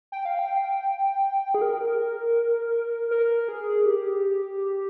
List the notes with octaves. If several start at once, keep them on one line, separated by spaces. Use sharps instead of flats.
G5
F5
G5
G#4
A#4
A#4
G#4
G4